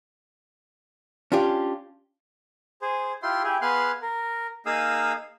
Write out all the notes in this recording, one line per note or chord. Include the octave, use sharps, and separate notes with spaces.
C#4 D4 F4 G4
G#4 C5
E4 F4 G4 C6
E4 G4 G#4
B3 G#4 F5 C6 F#6
A#4
A#3 D#4 G#4 F5 D#6 E6